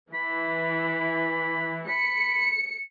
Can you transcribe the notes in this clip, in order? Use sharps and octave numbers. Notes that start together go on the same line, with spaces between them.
E3 B5
B5 C#7